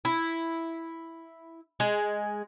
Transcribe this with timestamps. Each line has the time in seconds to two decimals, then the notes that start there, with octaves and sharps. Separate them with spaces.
0.05 E4
1.80 G#3